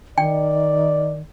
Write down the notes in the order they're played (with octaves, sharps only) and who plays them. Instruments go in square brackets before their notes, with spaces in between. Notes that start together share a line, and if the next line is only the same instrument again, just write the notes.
[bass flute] D#3 [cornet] D5 [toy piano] G5